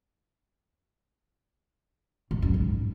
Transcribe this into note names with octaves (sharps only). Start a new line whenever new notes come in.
A2
F#2
G#2